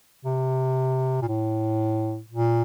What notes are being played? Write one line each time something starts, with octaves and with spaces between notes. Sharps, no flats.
C3
A#2
A2
A#2